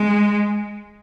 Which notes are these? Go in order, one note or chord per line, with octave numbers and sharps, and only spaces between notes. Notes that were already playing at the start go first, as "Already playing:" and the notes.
Already playing: G#3